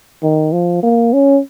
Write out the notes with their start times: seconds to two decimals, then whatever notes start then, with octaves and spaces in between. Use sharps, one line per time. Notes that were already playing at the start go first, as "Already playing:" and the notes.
0.23 D#3
0.52 F3
0.83 A#3
1.13 C#4